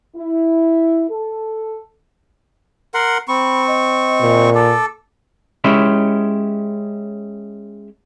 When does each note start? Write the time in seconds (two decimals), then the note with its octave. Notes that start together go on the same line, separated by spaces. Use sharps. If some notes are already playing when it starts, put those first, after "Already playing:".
0.16 E4
1.10 A4
2.94 A#4 F#5 C6
3.28 C4 B5 C#6
3.68 D#5
4.22 A#2
4.55 A4 D6
5.64 G#3 C#4 E4 G4 E5